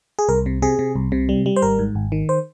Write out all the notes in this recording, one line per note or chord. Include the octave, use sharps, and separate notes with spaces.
G#4
C2 A#4
C3
C3 G#4
C3
C2
C3
G3
G3
C5
G#1 A#4
G#2
G#1
D#3
C5